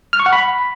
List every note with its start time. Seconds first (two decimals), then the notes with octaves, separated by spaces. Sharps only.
0.13 F6
0.20 C#6
0.26 F#5
0.33 B5